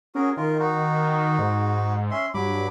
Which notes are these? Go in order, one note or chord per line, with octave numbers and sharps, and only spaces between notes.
C#4 F#4 G#4 A#4
D#3 F4 A#4
D#4 F#4
G#2
C#4 E5 C6
G2 F#3 B5 D6